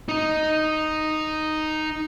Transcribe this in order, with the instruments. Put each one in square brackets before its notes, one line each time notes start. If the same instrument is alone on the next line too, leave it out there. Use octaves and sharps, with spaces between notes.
[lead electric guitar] D#4 D#5